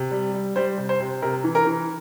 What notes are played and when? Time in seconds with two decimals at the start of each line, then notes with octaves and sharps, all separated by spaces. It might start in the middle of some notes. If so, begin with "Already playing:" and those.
Already playing: C3
0.11 G3
0.34 G3
0.56 G3 C5
0.78 C3
0.89 C5
1.00 C3
1.22 C3 A#4
1.44 E3
1.55 A#4
1.66 E3